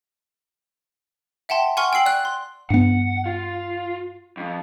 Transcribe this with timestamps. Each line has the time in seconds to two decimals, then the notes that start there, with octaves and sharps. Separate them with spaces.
1.49 E5 F#5 G5 A5 C6
1.77 F#5 G#5 C6 C#6 F6
1.93 G5 E6 C7 F#7
2.06 D5 F#6
2.25 C6
2.70 G2 B3 F#5
3.26 F4
4.37 F2